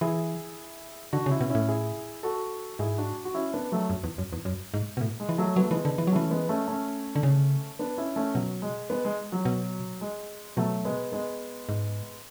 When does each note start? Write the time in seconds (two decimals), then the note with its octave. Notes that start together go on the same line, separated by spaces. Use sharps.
0.01 E3 E4 G#4
1.13 D3 D4 F#4
1.26 C#3
1.31 C#4 E4
1.41 B2
1.50 A2 C#4 E4
1.68 E4 G#4
2.23 F#4 A4
2.79 G#2 E4 G#4
2.98 D4 F#4
3.25 F#4
3.34 C#4 E4
3.53 B3 D4
3.72 F#3 A3
3.90 F#2
4.04 E2
4.18 F#2
4.33 E2
4.45 F#2
4.74 G#2
4.97 B2
5.01 A2
5.20 G#3
5.29 E3
5.38 F#3 A3
5.56 F#3 B3
5.64 A3
5.71 E3 G#3 B3
5.85 D3
5.98 E3
6.07 F#3
6.12 E3 A3 C#4
6.31 G#3 B3
6.49 A3 C#4
6.67 A3 C#4
7.16 D3
7.23 C#3
7.79 B3 D4
7.98 C#4 E4
8.16 A3 C#4
8.34 B2 F#3
8.62 G#3
8.90 G#3 B3
9.05 G#3
9.32 F#3
9.45 B2
10.01 G#3
10.56 B2 F#3 A3
10.85 G#3 B3
11.12 G#3 B3
11.69 G#2